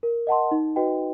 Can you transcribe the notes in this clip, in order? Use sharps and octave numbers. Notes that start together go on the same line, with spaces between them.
A#4
D#5 F#5 A5 C6
D#4
F#4 B4 D#5 G5